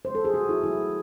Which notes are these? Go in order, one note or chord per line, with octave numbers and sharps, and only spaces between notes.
C#3 G#3 C5
A4
G#4
F#4
E4
D#3 F#3 A3 E4